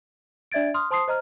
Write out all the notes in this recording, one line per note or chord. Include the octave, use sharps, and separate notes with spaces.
D4 D5 E5 G#6 A6 D7
C6 D#6 F6
C5 A5 C6 D#6 C7
C5 D#5 A#5 F6